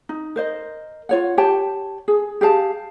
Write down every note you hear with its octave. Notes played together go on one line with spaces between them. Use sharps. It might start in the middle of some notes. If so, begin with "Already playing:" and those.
D#4
A#4 C5 D#5
F4 C#5 F#5
G4 C#5 G5 A5
G#4
G4 G#4 F5 A5